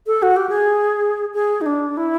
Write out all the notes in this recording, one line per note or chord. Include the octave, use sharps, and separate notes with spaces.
A4
F#4
G4
G#4
G#4
D#4
D4
E4